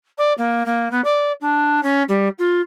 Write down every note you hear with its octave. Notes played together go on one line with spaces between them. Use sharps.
D5
A#3
A#3
B3
D5
D4
C#4
G3
F4